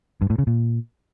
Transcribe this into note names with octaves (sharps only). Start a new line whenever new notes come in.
G2
A2
C#3
A#2